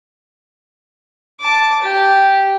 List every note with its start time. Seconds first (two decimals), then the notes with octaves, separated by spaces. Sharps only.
1.41 A5 D6
1.82 G4